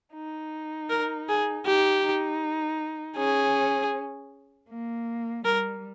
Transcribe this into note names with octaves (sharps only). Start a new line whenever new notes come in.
D#4
A#4
G#4
D#4 G4
D#4
C#4 G#4
A#3
G3 A#4